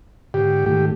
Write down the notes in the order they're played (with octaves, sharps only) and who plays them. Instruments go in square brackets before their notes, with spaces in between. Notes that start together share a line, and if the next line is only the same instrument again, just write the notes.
[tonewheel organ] G#2 D3 [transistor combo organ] G4
[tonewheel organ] G#2 D#3 A3 [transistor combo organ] G4